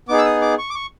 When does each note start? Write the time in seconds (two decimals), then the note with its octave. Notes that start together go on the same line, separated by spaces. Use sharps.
0.09 B3 D#4 G#4 D6
0.18 E6
0.25 D#6
0.42 D6
0.58 C#6
0.70 D6
0.75 C#6